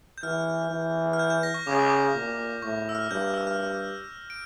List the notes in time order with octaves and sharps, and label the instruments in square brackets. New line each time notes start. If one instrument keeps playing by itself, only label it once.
[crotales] G6
[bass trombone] E3 [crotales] F6
[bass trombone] E3
[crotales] F6
G6
G6
A#6
C#6
[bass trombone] C#3 [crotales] D6
[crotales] C#6
D6
[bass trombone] A#2
[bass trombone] A2 [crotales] C#6
[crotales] E6
F6
[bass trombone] G2 [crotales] G6
[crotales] F6
E6
F6
D7